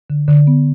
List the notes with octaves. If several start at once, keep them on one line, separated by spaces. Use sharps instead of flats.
D3
D3
B3